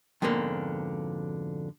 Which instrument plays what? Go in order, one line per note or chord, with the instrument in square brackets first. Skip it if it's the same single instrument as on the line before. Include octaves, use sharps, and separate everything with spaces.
[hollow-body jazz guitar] F2 G#2 B2 D3 A#3